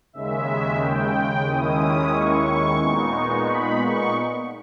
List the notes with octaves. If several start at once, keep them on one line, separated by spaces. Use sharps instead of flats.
D#2 C#3 G#3 E5
G5
D#2 D#3 G#3 C#4 E4 D#6
C#6
A#2 G#3 B3 D#4
B5
C#6